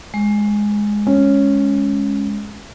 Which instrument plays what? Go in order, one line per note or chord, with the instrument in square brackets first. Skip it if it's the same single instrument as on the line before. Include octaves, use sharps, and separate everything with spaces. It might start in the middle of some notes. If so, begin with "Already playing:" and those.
[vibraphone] G#3
[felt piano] C#4